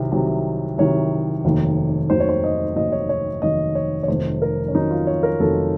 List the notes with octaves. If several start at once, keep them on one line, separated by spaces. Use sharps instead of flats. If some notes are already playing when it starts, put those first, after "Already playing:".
Already playing: C2 C3 D#3 F#3
C2 C3 D#3 F#3
C2 C3 D#3 F#3 C#5
F1 D#2 D#3 F#3
F1 D#2 D#3 F#3 C5
C#5
C5
D#5
F1 D#2 D#3 F#3 D#5
C#5
C#5
F1 D#2 D#3 F#3 D#5
C#5
C#5
F1 F2 D#3 F#3 C5
A#4
C#4
F1 F2 D#3 F#3 D#4
F4
C#5
A#4
F1 F2 D#3 F#3 A4